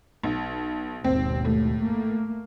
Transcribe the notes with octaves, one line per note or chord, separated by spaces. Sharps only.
B1
G#1 D#2 B2 C4
A2
A3 A#3